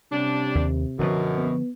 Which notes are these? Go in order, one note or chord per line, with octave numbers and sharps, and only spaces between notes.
C3 G3 C#4 D4
D#2
F#2 B2 D3 D#3 F3
B3